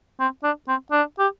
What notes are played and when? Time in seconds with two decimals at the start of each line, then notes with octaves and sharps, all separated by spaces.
0.20 C4
0.44 D4
0.68 C4
0.92 D4
1.19 G4